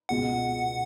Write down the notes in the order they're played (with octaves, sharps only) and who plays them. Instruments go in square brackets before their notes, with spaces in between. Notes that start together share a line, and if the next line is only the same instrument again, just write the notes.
[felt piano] C#2 B2 G#3 B3 F#4 [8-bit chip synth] F#5